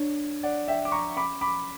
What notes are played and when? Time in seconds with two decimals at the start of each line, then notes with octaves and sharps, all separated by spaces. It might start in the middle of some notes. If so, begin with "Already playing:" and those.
Already playing: D4 C#5
0.43 D5 F#5
0.68 E5 G5
0.85 D6
0.92 A#5 C#6
1.17 C#4 B5 D6
1.41 B5 D6